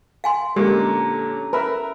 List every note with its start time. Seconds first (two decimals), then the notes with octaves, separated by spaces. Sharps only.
0.24 F5 G#5 C6
0.56 A#2 D3 G#3 C#4 G4 A4 A#4 A#5
1.53 A#4 B4 E5